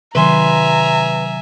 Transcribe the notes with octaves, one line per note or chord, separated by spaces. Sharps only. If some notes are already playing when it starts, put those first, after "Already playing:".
C3 D#3 F#3 B4 E5 G#5 A#5 C6